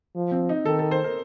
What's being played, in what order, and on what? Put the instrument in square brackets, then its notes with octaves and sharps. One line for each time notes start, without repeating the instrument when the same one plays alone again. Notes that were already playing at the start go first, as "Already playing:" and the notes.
[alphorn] F3
[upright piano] C4
D#4
[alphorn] D#3 [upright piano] A4
[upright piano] A4
C5
A#4